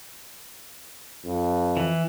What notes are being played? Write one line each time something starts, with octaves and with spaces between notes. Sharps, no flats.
F2
E3